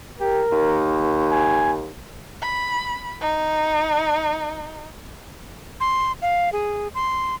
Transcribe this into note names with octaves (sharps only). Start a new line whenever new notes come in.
G4 A#4
D#2
G#5
B5
D#4
C6
F5
G#4
C6